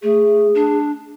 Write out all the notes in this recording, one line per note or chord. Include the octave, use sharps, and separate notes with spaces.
A3 G#4
D4